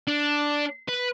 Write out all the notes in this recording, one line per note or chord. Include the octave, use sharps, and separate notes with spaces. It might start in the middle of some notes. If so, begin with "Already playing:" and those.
D4
B4